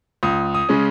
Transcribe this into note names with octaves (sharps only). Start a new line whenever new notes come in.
C#2 D#6
D#6
C#3 G#3 C#4